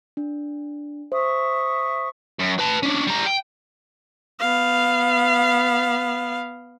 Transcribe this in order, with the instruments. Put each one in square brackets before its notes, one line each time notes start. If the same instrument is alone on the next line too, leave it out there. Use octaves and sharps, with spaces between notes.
[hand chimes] D4
[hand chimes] C5 [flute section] E5 C#6 D#6
[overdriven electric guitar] F#2
B4 A5
C#4 D4
G3 A#5
G5
[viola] B3 F5